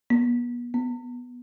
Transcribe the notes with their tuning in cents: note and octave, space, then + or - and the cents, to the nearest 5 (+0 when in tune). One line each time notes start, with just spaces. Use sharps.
B3 -35
B3 -5